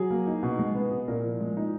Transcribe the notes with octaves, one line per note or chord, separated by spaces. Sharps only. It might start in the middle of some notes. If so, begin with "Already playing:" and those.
Already playing: F#3 G#4
A#3
D#4
B2
G#3
B3
B2
A#2 A#4
F3
G#3
D#4